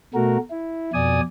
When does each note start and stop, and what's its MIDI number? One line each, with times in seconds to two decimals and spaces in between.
0.14 0.38 47
0.14 0.38 57
0.14 0.38 66
0.14 0.38 70
0.51 0.91 64
0.94 1.21 41
0.94 1.21 47
0.94 1.21 74
0.94 1.21 80
0.94 1.21 87